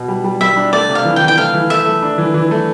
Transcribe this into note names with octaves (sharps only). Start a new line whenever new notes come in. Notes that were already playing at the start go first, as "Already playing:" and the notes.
Already playing: B2
G3
G3
G3 E5
D4
A3 D5
C3
F5
E3
G5
E3
G5
A3 F5
E3
A3 E5
A3
D4
E3
E3
A3